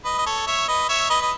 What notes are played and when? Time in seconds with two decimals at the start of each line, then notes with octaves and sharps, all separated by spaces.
0.04 B4 D#5
0.18 D#5
0.26 A4 C#5
0.47 C#5 E5
0.68 B4 D#5
0.89 C#5 E5
1.10 B4 D#5
1.22 D#5